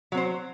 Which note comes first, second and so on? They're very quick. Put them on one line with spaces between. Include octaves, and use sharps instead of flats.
F#3 C4 C5